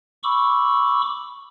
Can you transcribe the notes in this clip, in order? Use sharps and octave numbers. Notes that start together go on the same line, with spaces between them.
B5 C#6 D6 E6